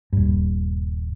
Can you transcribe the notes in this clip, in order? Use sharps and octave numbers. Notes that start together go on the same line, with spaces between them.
D#1 G2